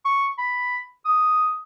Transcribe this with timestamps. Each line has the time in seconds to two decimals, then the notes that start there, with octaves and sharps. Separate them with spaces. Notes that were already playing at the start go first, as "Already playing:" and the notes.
0.05 C#6
0.38 B5
1.05 D#6